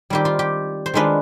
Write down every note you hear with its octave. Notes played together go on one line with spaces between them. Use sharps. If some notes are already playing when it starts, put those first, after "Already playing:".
D#3 G3 C4 F4 G4
F4
G4
C5
D#3 G#3 D4 F4 B4